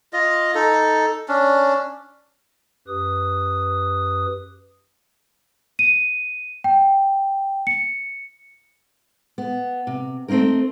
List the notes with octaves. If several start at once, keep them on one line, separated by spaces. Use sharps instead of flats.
F4 D#5
D#4 A4
C#4 D4
F#2 G4 B4 D#6
D#7
G5
C#7
B3
C3
A3 C4 C#4 D#4 A#4